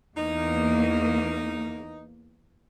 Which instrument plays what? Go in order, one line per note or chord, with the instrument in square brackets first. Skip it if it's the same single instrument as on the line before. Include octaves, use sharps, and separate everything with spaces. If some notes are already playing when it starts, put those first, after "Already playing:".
[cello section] E2 A#3 [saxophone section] D#4